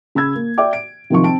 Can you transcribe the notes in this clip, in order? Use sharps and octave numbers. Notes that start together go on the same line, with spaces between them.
C#3 B5 E6 G#6
A#3
D5 E5 G5 D6
D7
C3 D#3 F3 C#6
C4 A5 D7